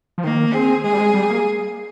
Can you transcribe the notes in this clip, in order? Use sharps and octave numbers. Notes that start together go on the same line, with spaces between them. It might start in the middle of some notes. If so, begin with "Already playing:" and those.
F3
D#3 A#3
C4 G#4
G#3 G#4
G3
G#3
G3
A#3